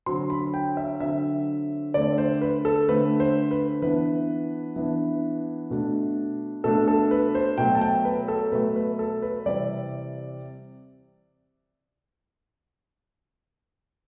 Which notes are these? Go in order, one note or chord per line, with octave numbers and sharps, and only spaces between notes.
D3 F#3 C4 C6
B5
G5
E5
D3 F#3 C4 E5
D3 A3 C4 D5
C5
B4
A4
D3 A3 C4 B4
C5
B4
E3 B3 D4 B4
E3 B3 D4
B2 A3 D4
B2 A3 D4 A4
A4
B4
C5
B2 F#3 A3 G5
A5
G5
B4
A4
B2 F#3 A3 B4
B4
A4
B4
C3 E3 G3 C4 D5